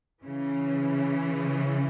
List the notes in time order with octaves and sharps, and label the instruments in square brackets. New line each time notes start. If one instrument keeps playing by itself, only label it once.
[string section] C#3 E3